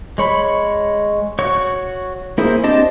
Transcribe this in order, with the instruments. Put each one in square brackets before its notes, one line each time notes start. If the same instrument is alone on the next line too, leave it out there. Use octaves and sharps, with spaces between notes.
[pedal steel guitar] G#3 C#5 B5
F#4 C#5 C#6
A#3 E4 G#4 C5
C4 D4 G4 D#5 A5